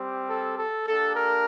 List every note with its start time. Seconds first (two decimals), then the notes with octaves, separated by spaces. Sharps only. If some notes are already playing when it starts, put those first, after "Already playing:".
Already playing: G3 C4 G4
0.28 A4
0.58 A4
0.86 A#3 D4 G4 A4
1.15 A#4